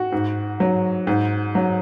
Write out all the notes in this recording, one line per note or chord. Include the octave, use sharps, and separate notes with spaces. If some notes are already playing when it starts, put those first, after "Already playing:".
Already playing: F#4
G#2
F#3
G#2
F#3